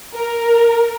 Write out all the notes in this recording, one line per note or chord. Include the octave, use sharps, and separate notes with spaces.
A#4